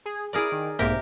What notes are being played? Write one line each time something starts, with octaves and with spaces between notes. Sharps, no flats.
G#4
E4 G#4 A#4 D5 D7
D#3
B1 G#2 C3 A#3 G4 A#4